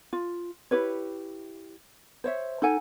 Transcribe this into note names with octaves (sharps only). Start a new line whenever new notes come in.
F4
E4 G4 B4 C#5
C5 C#5 E5
D#4 A4 F#5 G#5